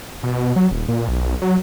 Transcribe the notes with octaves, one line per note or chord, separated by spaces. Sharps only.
B2
F#3
D#1
A#2
B1
F#3